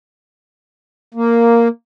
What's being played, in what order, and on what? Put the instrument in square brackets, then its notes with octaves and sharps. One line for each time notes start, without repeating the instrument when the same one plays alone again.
[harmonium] A#3